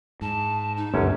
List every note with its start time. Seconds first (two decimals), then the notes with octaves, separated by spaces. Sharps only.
0.22 G#2 A5
0.77 D#4
0.94 G1 C#2 F#2 A#2 C#4